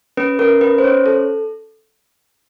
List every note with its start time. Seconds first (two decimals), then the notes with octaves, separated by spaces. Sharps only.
0.17 C#4 B4
0.39 C#4 A#4
0.61 C#4 B4
0.78 C5
0.84 C#4 C#5
1.06 A4